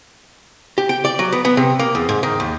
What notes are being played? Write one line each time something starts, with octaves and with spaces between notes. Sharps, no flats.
G4
G5
D5
F#3
B3
B3
C3
A#3
E2
G#2
D#3
D#2